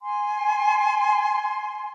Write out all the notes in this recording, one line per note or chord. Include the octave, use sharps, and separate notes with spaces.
G#5 C6